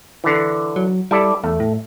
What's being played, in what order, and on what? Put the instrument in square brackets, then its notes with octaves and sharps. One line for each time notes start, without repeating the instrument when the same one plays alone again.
[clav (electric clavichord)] D3 E3
[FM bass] F#3
[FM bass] G3 [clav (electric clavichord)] E4 A4 D5
[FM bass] E2 [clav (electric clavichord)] A3
[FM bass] A2